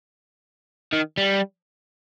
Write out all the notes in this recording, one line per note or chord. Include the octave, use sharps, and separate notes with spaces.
D#3
G3